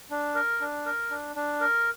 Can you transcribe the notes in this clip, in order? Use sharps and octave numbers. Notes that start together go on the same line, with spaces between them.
D4
A#4
D4
A#4
D4
D4
A#4